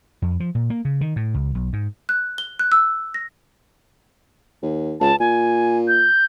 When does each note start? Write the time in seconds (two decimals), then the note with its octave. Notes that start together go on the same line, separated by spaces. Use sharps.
0.22 F2
0.40 F3
0.55 A#2
0.70 A#3
0.85 C#3
1.01 D#3
1.16 A2
1.34 C#2
1.55 B1
1.73 G#2
2.09 F#6
2.38 G7
2.59 F#6
2.72 E6
3.14 A#6
4.62 D#2
5.01 C#2 A5
5.20 A#2 G#5
5.88 G6